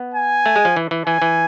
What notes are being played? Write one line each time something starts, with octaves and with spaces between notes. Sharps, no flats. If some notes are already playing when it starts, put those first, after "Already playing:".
Already playing: B3
G#5
A3
G#3
F3
E3
E3
E3 G#5
E3